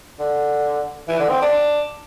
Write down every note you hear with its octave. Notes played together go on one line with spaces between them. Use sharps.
D3
E3
D3
C4
D4